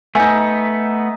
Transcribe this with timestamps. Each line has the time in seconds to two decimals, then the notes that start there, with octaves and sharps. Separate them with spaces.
0.15 A3 B3 D#4 E5 G#5